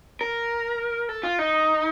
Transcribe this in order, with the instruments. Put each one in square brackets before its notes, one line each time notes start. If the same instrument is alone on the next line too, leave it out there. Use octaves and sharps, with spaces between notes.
[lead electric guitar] A#4
A4
F4
D#4